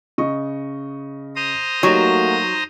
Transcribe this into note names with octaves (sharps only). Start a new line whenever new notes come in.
C#3 D#5 C#6
C5 A#5 D#6
F#3 A3 A#3 D#4 F#4 G4